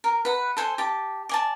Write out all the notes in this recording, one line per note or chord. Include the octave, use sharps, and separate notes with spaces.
A#4
B4 F#5
A4 C5 G#5
G4 A5
D5 G#5 A5